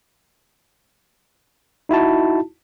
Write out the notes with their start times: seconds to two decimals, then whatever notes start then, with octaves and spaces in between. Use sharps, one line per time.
1.89 D#4 E4 F#4 A5